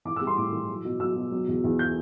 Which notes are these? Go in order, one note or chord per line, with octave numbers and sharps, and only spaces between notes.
E3 D6
G3 E6
C6
A2 D6
E3
F#3
B2
F#3 E6
B2
F#3
E2
E2
G6